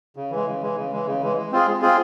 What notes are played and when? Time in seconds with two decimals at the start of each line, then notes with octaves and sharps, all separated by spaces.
0.16 C#3
0.31 E3 G#3
0.47 C#3
0.61 E3 G#3
0.77 C#3
0.92 E3 G#3
1.07 C#3
1.22 E3 G#3
1.37 G#3
1.52 C4 F4 G#4
1.67 G#3
1.82 C4 F4 G#4